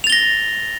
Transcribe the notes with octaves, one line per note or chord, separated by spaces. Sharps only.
A6 A#6 F7 G7